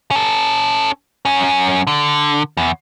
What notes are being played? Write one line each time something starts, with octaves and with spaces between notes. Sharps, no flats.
C#4 A4
F#2 C#4
D3
E2